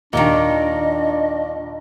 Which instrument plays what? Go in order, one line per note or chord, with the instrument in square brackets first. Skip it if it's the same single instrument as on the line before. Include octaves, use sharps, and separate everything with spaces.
[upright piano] D#2 [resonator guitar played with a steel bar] A#2 D#3 [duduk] D4 [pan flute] D#5